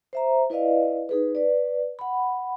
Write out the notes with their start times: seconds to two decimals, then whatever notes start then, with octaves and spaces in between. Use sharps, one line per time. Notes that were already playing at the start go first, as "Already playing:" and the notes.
0.13 C5 E5 A#5
0.50 E4 B4 D5 D#5 F5
1.09 D#4 G#4 B4
1.35 B4 D5
1.99 F#5 B5